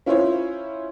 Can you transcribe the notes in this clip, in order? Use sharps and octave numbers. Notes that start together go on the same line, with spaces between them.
C#4 E4 F4 C5 C#5